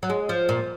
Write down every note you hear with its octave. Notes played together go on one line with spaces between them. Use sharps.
F#3
G#3
F3
A#2